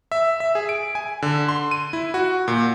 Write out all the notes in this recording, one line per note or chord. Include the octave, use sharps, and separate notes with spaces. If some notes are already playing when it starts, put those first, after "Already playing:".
E5
E5
G#4
D7
G#5
D3
C6
D#7
E4
F#4
A#2